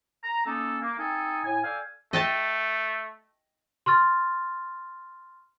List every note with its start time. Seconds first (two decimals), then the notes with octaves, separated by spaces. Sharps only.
0.23 A#5
0.46 A#3 C#4 D#4 A4
0.81 A#3
0.98 C4 D#4 A4 D#5 G#5
1.44 A2 G#5
1.64 A4 D5 F5 G5 G#5
2.13 A3 D#5 G5 A5
3.86 C6 C#6 F6 A6